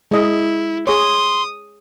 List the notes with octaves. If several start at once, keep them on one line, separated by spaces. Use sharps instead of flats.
G#3 E4 D#5
G#4 C#5 C6 D#6